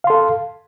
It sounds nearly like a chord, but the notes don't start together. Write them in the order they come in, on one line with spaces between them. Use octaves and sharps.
F5 C6 A4